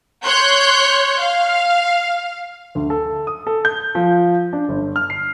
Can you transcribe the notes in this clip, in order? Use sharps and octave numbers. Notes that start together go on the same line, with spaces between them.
C#5 C6 F#6 G6
F5
D2
A4
D#6
A4
G6
F3
D4
G1
F6
C7